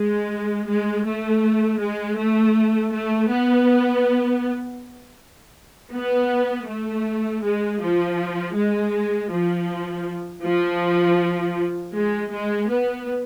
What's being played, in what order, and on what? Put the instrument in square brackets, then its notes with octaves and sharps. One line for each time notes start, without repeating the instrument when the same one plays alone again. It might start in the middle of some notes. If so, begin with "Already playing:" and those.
Already playing: [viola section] G#3
G#3
A3
G#3
A3
A3
B3
B3
A3
G#3
F3
G#3
F3
F3
G#3
G#3
B3